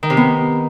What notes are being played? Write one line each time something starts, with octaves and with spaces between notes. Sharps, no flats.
D#3
C3
B3